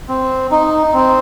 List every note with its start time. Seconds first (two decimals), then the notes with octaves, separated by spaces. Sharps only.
0.09 C4
0.51 D#4
0.87 D#4
0.94 C4